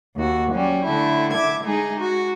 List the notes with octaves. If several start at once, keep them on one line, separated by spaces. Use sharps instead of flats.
D#2 F#4
F#3 G3 C#4
D3 A3 E4
E5 D6 G#6
G#3 D#4 G#4
F#4